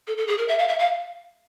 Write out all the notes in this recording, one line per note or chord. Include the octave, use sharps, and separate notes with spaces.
A4
A4
G#4
A#4
E5
F5
E5
F5